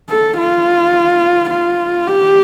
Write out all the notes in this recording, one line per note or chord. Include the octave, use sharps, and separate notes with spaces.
A4
F4
F4
G4